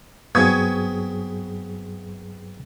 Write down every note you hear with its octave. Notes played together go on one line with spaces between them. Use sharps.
G2 F#3 B3 C4 G#4 C#6 D#6 G#6